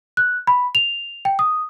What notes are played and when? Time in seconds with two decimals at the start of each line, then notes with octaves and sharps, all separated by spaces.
0.17 F#6
0.47 B5
0.75 F7
1.25 G5
1.39 D#6